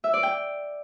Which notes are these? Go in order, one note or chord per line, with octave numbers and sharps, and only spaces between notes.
E5
D5
G5